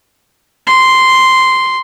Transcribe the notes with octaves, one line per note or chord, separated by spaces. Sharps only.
C6